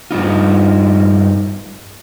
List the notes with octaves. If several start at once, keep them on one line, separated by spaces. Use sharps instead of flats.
G2 C3 D#4 F4